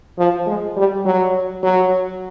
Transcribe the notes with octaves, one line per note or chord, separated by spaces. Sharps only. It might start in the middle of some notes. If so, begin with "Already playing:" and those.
F3
G#3
G3
F#3
F#3